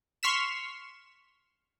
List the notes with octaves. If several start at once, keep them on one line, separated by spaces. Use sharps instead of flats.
C6 C#6 F6 B6 E7